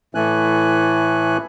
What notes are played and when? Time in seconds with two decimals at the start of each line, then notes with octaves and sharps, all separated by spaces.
0.15 A2 E3 A3 G#5 F#6